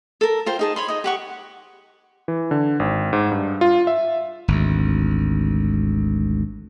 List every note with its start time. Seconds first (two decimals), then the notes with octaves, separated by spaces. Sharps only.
0.21 A4 A#4
0.46 F4 C5 G5
0.59 D#4 G#4 A5
0.76 C#5 B5 C6
0.88 D#4 D#5
1.04 G4 F#5 C#6
2.28 E3
2.51 D3
2.80 G#1
3.13 G#2
3.32 G2
3.61 F4
3.87 E5
4.48 G#1 D2